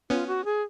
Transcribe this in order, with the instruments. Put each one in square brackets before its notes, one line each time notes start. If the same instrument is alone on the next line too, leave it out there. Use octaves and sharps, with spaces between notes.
[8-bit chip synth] B3 C#4 [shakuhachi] F4
[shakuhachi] F#4
G#4